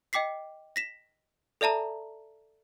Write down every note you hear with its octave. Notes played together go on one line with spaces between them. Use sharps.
D#5 G5 D6 B6 C7
A#6 B6 E7
A4 D5 E5 A5 A#5